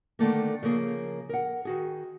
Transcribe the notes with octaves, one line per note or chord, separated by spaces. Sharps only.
D3 D#3 A3 A#3
C#3 F3 A#3 G#4
A#4 F#5
D#3 F#4 G#4